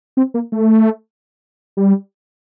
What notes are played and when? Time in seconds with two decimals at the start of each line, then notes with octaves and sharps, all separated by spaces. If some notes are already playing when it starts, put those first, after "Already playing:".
0.17 C4
0.34 A#3
0.52 A3
1.77 G3